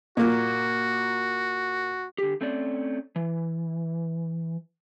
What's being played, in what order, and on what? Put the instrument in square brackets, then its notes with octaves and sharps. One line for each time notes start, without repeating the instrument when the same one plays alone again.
[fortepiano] A#2 A#3 [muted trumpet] F#4
[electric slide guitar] D3 G4
A3 C4 C#4 D5
E3